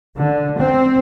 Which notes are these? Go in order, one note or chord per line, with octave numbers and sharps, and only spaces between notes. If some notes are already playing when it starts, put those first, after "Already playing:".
D3
C4